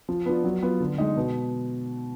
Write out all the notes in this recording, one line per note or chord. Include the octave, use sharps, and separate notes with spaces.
F3
B3 D4 F4
F#3
B3 F4
D3
G#3 D#4
B2